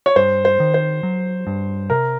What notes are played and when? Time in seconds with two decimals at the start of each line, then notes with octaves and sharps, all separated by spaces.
0.06 C#5
0.16 G2 C5
0.45 C5
0.60 D#3
0.74 C5
1.03 F#3
1.47 G2
1.90 C3 A#4